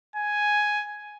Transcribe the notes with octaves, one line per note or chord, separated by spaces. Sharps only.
G#5